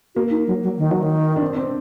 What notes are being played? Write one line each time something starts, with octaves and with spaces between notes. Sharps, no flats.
A#3 F#4
D#4
F#3
F#3
D#3
F#3
D#3
D4
C4
D4
C4